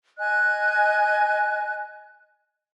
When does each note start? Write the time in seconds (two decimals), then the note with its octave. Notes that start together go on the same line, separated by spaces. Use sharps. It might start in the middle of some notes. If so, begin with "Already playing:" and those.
0.18 D#5 G#5 F#6